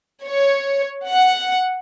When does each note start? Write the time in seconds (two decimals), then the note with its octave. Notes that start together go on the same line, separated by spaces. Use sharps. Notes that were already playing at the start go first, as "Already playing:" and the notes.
0.25 C#5
1.06 F#5